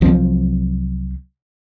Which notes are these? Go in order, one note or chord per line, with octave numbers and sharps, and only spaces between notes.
C2 F3 F#3 C4